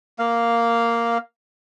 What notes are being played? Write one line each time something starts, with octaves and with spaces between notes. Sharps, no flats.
A#3 F5